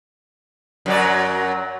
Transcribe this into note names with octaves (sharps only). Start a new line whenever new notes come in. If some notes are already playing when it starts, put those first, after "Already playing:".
F#2 F#3 D5